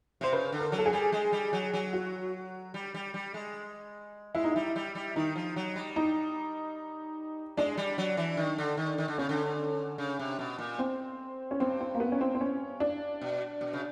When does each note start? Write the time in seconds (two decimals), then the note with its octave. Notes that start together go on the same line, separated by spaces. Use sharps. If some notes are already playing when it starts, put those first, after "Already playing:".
0.21 C3 C5
0.32 C#3 B4
0.52 D3
0.59 A#4
0.72 F#3
0.78 A4
0.86 G#4
0.93 G3
1.12 G#3
1.32 G3
1.53 F#3
1.73 F#3
1.93 F#4
2.74 G3
2.94 G3
3.14 G3
3.34 G#3
4.35 G#3 E4
4.44 D#4
4.52 G3 E4
4.76 G3
4.95 G3
5.16 D#3 D#4
5.35 F3
5.56 F#3
5.76 G3
5.96 D#4
7.57 G#3 D4
7.78 G3
7.98 F#3
8.17 E3
8.37 D#3
8.58 D3
8.77 D#3
8.98 D#3
9.08 D3
9.18 C#3 C#4
9.29 D3
9.98 C#3
10.19 C3
10.39 B2
10.59 A#2
10.79 C4
11.51 C#4
11.60 G2 C4
11.81 C4
11.95 A#3
12.00 B3
12.12 C#4
12.21 C4
12.35 C4
12.41 C#4
12.80 D4
13.21 B2
13.61 B2
13.73 C#3